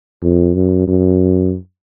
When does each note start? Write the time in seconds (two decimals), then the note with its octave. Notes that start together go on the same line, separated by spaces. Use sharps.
0.22 F2
0.55 F#2
0.87 F#2